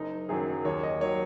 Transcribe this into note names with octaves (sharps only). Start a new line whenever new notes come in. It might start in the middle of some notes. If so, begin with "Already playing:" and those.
Already playing: F#1 D#4
F#2 D#3 F#3 G#4
D#2 C#5
D#5
D#3 F#3 C#5